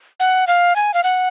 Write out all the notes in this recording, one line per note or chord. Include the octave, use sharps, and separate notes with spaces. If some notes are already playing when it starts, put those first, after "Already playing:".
F#5
F5
G#5
F5
F#5